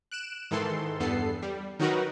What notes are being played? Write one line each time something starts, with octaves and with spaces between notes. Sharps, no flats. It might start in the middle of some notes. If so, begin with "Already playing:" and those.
F#6 D7 E7
G#2 D#3 E3 A4 C6
E2 G2 B3 A4 C7
G3
D#3 F#3 D#4 F#4 A#4 B4